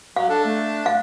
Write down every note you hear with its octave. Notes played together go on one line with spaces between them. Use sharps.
F#3 F5
D4 A4
A3
F5